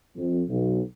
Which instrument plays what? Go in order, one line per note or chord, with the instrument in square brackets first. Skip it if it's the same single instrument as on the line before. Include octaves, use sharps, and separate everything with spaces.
[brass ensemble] F2
B1